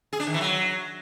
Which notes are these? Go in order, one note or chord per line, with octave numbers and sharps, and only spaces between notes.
G#4
D4
D#3
E3
F#3